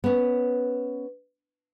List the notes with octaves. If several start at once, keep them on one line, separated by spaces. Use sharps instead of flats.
B3 C#4